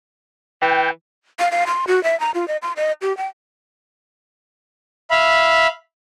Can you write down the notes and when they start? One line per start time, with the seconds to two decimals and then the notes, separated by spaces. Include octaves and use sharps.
0.62 E3 G5
1.39 F5
1.52 F5
1.67 C6
1.87 F#4
2.04 E5
2.20 A#5
2.35 F4
2.48 D#5
2.62 C6
2.77 D#5
3.02 G4
3.17 G5
5.11 E5 F5 B5